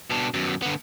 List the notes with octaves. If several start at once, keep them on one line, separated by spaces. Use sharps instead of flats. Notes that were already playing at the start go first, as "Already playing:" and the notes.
B2 D4
F#2 B2
D3 B3